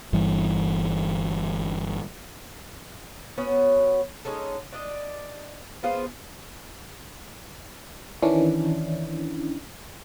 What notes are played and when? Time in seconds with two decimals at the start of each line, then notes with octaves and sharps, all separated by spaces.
0.13 G1 G2 E3
3.37 B3 C#4 F#4 C#5
4.25 G#3 C#4 D#4 A4
4.73 D4 D5 D#5
5.83 B3 F4 G#4 C5
8.22 D#3 E3 C#4 D4 E4